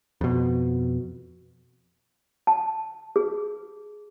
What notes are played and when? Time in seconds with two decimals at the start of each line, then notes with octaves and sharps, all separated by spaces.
0.21 F2 B2
2.47 A5
3.16 G#4